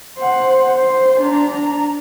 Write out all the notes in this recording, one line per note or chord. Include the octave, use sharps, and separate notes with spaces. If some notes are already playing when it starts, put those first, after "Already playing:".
C5 F#5
C5
D4 A#5